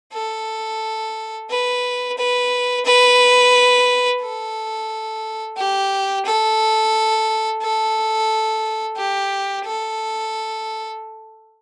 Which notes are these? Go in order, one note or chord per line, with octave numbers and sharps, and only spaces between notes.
A4
B4
B4
B4
A4
G4
A4
A4
G4
A4